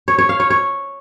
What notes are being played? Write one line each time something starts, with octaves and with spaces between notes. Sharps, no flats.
C#5
C#5
F5
C#5
C#5